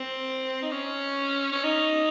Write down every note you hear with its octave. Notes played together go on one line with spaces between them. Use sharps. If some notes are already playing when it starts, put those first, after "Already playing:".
Already playing: C4
D#4
C#4
C#4
D#4